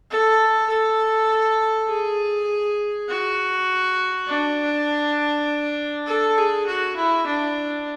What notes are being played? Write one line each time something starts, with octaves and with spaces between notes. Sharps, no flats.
A4
A4
G#4
F#4
D4
A4
G#4
F#4
E4
D4